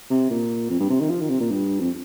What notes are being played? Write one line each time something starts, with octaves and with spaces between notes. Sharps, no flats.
C3
A#2
F2
G2
C3
D#3
F3
D#3
C3
A#2
G2
F2